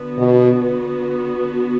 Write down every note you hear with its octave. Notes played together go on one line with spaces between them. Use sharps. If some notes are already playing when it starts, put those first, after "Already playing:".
Already playing: D3 B3 F#4
B2